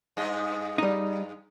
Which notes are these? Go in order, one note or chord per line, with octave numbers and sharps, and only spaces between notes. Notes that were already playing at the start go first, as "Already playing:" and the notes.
G2 G#4 D#5
G3 D#4